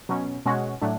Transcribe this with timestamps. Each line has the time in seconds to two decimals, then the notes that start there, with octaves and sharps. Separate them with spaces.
0.09 B2 F#3 C#4
0.46 B2 G#3 C#4 F#4
0.81 A2 F#3 A3 D4